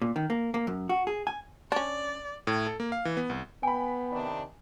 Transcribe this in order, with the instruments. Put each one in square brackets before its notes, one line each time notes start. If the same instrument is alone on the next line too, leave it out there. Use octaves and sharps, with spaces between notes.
[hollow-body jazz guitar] A#2
D#3
A#3
A#3
F#2
F#4
G#4
G#5
[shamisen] C#4 D4 [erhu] D5
[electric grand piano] A2
A4
A#3
F5
E3
B3
C2
[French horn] B3 [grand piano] G5 B5 [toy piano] G#5
[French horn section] C3 D#3 D4